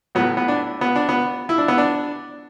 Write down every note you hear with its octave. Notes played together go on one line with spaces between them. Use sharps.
A2 F#3 B3
B3
D4
B3
D4
B3
E4
D4
B3
D4